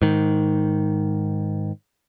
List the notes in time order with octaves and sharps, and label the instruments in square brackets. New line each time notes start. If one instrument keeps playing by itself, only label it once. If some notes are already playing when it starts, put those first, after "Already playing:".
[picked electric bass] G#2 D#3